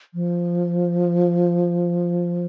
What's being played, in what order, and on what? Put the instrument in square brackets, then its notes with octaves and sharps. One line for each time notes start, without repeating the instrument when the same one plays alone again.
[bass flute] F3